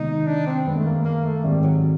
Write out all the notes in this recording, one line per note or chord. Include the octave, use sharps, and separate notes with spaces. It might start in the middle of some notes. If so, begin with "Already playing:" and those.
Already playing: C3 D#3 G#3 B3 D#4
D4
C4
F#2 D#3 G#3 B3
A3
A#3
A#3
A3
G#2 D#3 G3 G#3 C4
F#3